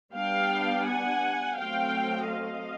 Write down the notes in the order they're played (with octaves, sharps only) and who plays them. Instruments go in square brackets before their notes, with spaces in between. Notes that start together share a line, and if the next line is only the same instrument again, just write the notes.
[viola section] G3 B3 D4 F5 G5
F#5 G#5
F#3 A3 C4 F5 G5
D#5 F5